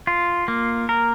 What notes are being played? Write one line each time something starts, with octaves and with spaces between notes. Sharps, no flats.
F4
A#3
A#4